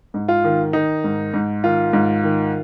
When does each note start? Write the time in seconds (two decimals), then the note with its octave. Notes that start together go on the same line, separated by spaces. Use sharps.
0.14 G#2
0.28 F4
0.44 D#3
0.73 D#3 D#4
1.04 G#2
1.34 G#2
1.64 D#3 F4
1.93 G#2
2.24 D#3